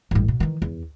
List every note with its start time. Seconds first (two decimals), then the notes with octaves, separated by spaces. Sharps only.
0.11 A1 G2
0.28 B2
0.40 D#3 E3
0.62 E2